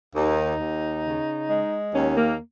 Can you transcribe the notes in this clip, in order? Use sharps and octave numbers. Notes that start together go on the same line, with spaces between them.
D#2 D#4
D#2
C#3
G#3
D#2 C#4
A#3